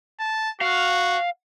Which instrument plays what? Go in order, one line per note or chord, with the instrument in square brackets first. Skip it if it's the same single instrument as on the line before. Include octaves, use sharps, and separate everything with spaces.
[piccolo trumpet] A5
[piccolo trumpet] F#4 [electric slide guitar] F5